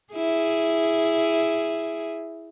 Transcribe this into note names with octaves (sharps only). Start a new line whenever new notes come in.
E4 G#4